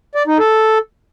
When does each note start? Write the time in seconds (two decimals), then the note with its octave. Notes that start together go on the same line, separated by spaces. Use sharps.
0.15 D5
0.27 D#4
0.39 A4